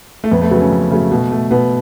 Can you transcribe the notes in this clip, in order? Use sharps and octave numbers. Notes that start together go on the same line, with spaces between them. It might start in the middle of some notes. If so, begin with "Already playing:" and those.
A3
F2 B3
A3
C#3 F#3 B3
C#4
F2
C#3 F#3 A3
B2
A3
B2 B3